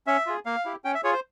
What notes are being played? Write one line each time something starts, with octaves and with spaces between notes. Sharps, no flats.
C#4 E5
F4 G#4
A#3 F5
E4 G4
C#4 G5
E5
F4 G#4 C#5
C5